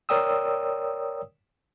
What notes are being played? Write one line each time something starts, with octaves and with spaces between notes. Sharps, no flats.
A#4 C#5 D5 G5 D#6 E6